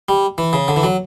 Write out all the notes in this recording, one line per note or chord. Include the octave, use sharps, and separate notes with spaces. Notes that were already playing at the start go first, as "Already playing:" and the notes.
G3
E3
C#3
D3
E3
F#3